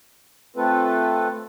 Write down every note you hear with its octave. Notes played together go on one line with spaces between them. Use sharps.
A3 C4 F4 A4 B4